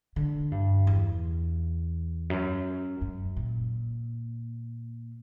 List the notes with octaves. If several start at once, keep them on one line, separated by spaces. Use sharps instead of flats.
D3
G2
E2
F#2
F#2
A#2